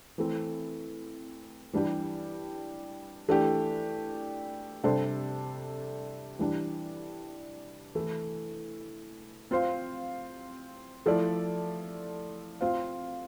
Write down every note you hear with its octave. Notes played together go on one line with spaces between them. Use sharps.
E3 A3 C4
E3 G3 D4 G4
E3 A3 D4 G4
C3 G3 D4 A4 C5
E3 G3 D4
E3 A3 E4
C4 F4 C5 F5
F3 A3 E4 A4 D5
C4 F4 C5 F5